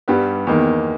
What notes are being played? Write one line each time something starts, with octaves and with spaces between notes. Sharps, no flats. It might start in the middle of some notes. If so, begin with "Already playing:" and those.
G2 G3 B3 G4
E2 D#3 A#3